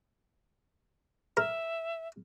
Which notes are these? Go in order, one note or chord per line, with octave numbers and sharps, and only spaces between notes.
A#4 E5